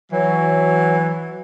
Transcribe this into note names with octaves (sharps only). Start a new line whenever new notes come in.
E3 F#3